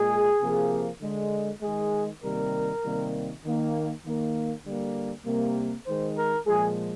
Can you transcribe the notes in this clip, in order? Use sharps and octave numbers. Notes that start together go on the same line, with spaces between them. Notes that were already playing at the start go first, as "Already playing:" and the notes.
Already playing: A#2 G#3 G#4
C3 F3 A#3
D3 G#3
D#3 G#3 G#4
C3 D#3 G3 A#3 A#4
C3 D#3 G3 A#3
D#3 A#3
D#3 A#3
D3 G3 A#3
C3 G3 A#3
D#3 G#3 C5
A#4
A#2 F3 G#3 G#4